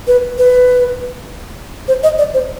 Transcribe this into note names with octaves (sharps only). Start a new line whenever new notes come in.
B4
B4
C5
D#5
D5
C5